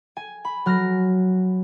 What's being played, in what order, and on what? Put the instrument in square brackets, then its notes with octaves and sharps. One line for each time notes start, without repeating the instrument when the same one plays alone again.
[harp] G#5
B5
F#3 F6 A#6